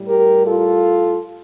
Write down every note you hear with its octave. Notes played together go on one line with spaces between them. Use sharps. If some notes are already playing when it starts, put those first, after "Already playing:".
Already playing: A2 G3
G4 A#4
F4 A4